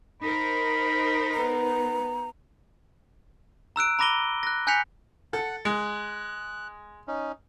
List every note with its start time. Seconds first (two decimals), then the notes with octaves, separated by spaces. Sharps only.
0.22 D#4 A#4 C5 B5
1.34 B3 B4 A#5
3.76 A#5 E6 F#6 D7
3.99 A#5 B5 D6 A#6 D#7 G7
4.43 F#6 A#6
4.67 G#5 F#6 G6 B6 C#7 F7
5.33 A4 F#5 F#6
5.65 G#3 F#6
7.08 C#4 D#4